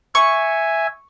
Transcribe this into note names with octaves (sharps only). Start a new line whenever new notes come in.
E5 G#5 C#6